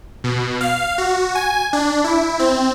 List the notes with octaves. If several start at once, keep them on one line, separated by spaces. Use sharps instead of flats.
B2
F5
F#4
G#5
D4
E4
C4